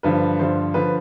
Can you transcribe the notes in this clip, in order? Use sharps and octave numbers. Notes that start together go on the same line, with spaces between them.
G2 D3 F3 B4
G2 D3 F3 C5
D3 F3 B4